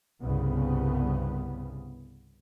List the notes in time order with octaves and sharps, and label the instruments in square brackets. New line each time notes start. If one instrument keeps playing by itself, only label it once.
[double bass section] C2 G2 C#3 B3